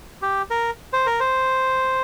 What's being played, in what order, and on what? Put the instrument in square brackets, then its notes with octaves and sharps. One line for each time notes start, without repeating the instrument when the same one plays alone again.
[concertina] G4
A#4
C5
A#4
C5